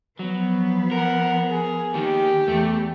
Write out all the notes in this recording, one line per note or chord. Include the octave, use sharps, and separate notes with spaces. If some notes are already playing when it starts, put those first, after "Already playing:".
F3 F#3 B3
A#4 F#5
G#4
D#2 D#3 G4
E2 A3